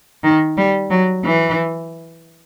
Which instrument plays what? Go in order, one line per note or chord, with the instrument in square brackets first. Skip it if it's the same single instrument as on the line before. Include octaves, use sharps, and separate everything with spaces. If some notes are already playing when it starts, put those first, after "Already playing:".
[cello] D#3
G3
F#3
E3